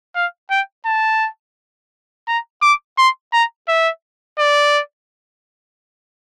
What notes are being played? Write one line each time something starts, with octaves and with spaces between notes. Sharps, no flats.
F5
G5
A5
A#5
D6
C6
A#5
E5
D5